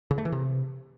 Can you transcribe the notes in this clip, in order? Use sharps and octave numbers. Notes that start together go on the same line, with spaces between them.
C#3
A3
E3
C3